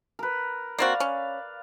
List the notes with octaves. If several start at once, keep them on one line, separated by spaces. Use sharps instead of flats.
A#4 B4
A#3 C4 F#4 D5 F5
C#4